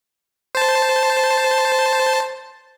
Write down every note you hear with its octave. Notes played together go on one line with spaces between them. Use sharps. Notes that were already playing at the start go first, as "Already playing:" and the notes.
C5 A5